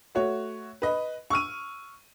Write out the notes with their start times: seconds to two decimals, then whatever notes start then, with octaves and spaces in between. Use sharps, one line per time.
0.15 A3 F#4 C#5
0.82 B4 D#5
1.30 C#6 E6 F6 D#7